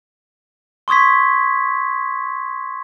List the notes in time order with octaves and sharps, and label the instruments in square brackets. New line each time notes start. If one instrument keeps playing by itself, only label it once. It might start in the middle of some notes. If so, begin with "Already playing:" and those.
[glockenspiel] C6 C#6 D#6 G#6 B6